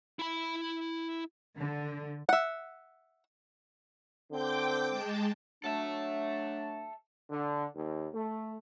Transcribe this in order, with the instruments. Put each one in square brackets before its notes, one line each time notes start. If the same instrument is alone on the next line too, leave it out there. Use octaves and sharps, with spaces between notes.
[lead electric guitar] E4 B5
[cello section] D3
[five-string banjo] E5 F#5
[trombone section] D3 C4 [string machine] G5 D6 G6
[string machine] G#3 A5
[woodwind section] F#3 A3 D4 [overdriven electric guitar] A4 E5
[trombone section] D3
D#2
A3